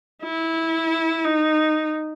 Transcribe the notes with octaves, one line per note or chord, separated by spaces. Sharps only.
E4
D#4